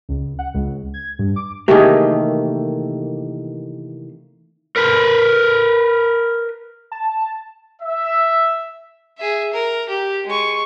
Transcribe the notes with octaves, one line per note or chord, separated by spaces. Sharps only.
C#2
F#5
C#2
G#6
G2
D6
C3 D#3 E3 A3 A#3 G4 G#4
A#4 B4
A5
E5
G#4 E5
A#4
G4
G#3 C#6